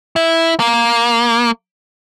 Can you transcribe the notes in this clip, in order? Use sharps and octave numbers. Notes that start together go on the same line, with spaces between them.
E4
A#3